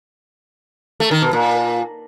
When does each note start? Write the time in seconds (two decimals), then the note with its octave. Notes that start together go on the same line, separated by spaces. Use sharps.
1.00 A3
1.11 D#3
1.22 B2
1.33 A#2